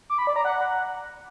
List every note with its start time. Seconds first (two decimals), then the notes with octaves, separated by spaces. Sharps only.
0.10 D6
0.18 B5
0.27 D5
0.36 A#5
0.45 F#5